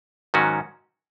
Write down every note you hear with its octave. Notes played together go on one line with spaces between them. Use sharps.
G#2 D#3 F#3 C#4 F#4